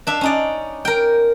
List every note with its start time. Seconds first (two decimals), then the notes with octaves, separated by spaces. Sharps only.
0.07 D4 E5 F5
0.21 C#4 D#4 D5
0.85 A#4 G5